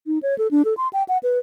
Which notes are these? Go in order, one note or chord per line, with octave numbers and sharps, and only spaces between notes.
D#4
C#5
A4
D4
A4
C6
G5
F#5
B4